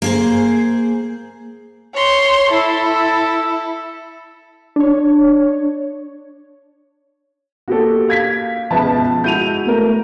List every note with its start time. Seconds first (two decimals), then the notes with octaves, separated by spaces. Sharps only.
0.02 A#3 G#4 C5
1.94 C#5 C6
2.50 E4 A4
4.76 D4 C#5
7.68 A#3 F#4 G4 A4
8.08 F5 G#6 B6
8.71 C#2 B2 F3 B4 E5 A5
9.24 G#3 E4 F#4 G6 D#7 F7
9.66 A3 A#4